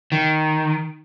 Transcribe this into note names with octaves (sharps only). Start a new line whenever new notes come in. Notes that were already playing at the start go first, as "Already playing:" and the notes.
D#3